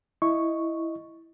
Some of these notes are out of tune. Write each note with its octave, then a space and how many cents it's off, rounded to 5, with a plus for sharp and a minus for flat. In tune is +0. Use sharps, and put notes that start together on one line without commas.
E4 +0 D#5 +0 C#6 +0